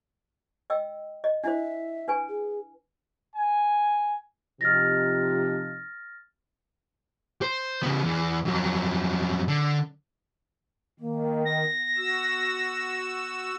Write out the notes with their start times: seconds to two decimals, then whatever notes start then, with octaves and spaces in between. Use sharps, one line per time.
0.70 D#5 G5 E6
1.24 D#5
1.44 D4 E4 C5 E5
2.08 D4 B4 G#5
2.28 G#4
3.36 G#5
4.61 C3 F3 D#4 F6 A6 A#6
7.42 C5
7.83 C#3 B3
8.02 E2
8.45 F2 F#3
9.48 D3
11.00 D#3 A#3
11.45 B3 A#6
11.97 F#4 E6